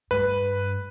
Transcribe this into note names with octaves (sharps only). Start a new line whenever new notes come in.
G2 B4